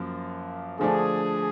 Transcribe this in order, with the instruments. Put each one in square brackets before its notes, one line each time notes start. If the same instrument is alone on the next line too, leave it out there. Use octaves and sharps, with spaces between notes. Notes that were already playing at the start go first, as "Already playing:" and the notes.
Already playing: [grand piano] F#2 F3 A#3
[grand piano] D3 F3 A3 D4 [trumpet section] G#4